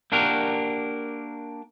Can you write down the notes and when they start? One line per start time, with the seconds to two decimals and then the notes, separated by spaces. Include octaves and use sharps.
0.12 A#3 D4 F#4 G4 A#4